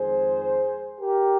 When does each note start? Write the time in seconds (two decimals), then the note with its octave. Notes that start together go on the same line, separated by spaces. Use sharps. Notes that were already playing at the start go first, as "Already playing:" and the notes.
Already playing: F2 D#3 G#3 G#4 C5
1.00 G4 A#4